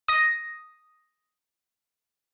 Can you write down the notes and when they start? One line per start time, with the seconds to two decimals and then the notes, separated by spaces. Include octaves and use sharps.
0.08 D#6 A#6